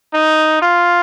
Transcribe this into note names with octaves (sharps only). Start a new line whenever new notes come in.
D#4
F4